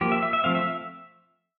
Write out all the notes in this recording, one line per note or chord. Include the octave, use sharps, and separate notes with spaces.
F3 A#3 G4
E5
E5
E5
F3 A3 C4 F5
E5